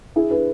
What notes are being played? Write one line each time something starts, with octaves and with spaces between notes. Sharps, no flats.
E4 G#4
G#4 B4